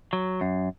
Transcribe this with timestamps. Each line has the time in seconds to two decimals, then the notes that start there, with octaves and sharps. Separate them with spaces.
0.13 F#3
0.41 F#2